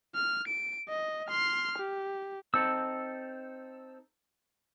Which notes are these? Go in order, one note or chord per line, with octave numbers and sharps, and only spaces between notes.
F6
D7
D#5
C6 F6
G4
C4 D#4 A4 E6